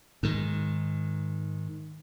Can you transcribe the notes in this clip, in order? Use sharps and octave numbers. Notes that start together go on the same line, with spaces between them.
G#2 D#3